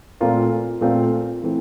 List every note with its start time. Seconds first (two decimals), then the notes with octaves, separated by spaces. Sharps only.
0.21 A#2 A3 C4 F4 A#4
0.81 A#2 A3 C4 F4 A#4
1.43 E3 A3 C4